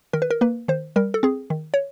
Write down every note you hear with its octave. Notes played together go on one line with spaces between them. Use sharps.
D#3 A#4
B4
A#4
A#3 B4
D#3 C5
G3 A#4
A4
C4 G#4
D#3
C#5